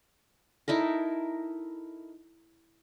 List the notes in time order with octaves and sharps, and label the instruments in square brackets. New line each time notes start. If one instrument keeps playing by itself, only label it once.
[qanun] D#4 E4 A4 A#4